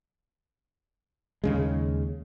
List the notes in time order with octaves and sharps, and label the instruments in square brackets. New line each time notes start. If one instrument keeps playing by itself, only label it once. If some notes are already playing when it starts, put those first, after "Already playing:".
[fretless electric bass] D#2 C#3 G#3